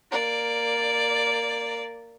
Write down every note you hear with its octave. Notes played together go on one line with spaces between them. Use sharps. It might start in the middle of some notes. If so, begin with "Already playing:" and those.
A#3 D5